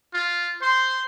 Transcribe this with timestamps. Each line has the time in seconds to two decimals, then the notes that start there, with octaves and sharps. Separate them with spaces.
0.14 F4
0.62 C5 C6